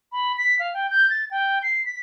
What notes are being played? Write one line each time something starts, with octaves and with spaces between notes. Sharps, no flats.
B5
B6
F5
G5
G6
A6
G5
C7
B6